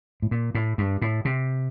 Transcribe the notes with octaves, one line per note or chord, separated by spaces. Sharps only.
A2
A#2
A2
G2
A2
C3